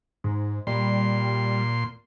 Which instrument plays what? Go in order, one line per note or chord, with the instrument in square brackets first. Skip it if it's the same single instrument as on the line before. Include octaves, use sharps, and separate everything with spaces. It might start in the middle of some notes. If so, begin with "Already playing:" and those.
[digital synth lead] G#2
[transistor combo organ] A#2 C6 [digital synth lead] G3